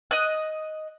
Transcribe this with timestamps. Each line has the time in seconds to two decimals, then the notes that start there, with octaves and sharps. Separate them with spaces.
0.11 D#5 F#6